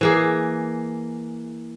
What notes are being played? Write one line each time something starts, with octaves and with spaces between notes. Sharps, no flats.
E3 A#3 G#4